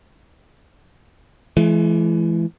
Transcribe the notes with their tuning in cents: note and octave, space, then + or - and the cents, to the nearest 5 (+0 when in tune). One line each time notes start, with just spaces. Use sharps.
E3 +20 G#3 +45